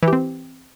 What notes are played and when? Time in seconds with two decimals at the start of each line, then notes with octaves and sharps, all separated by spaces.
0.03 E3
0.08 G4
0.13 C4